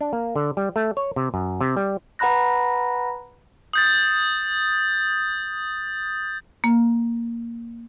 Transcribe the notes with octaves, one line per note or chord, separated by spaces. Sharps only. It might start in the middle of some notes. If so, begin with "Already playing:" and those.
D4
A#3
D3
G3
A3
C#5
C3
F#2
C3
G3
B4 F#5 A#5 B5 F#6 A#6
D#6 G6 A6
A#3